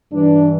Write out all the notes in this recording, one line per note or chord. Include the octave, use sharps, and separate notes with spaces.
G2 E3 D4